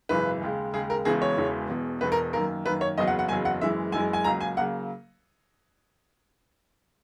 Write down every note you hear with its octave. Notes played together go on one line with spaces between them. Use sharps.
G#1 F#2 C#3 E3 B4
D#2 C#3 G#3
D#2 C#3 G#3 G#4
A#4
E1 E2 C#3 E3 G#3 G#4
C#5
E1 E2 C#3 E3 G#3
E1 E2 B2
E1 E2 B2 B4
A#4
F#2 D#3 A#3 A#4
F#2 D#3 A#3 B4
C#5
F#1 E2 C#3 F#3 D#5
F#5
F#5
F#1 E2 C#3 F#3 G#5
F#5
F#1 F#2 E3 G#3 E5
F#1 F#2 E3 G#3 G#5
G#5
C#2 C#3 F#3 A#3 A#5
G#5
C#3 F#3 A#3 F#5